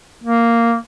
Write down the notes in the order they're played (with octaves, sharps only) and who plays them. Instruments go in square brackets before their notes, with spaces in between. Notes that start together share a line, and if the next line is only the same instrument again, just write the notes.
[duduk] A#3